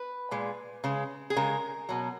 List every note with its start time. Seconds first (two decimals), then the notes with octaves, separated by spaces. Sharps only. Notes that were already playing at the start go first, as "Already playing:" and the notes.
Already playing: B4
0.31 A#2 G#3
0.84 C#3 G#3
1.30 G#4
1.36 C#3 G#3 A#4
1.89 B2 F#3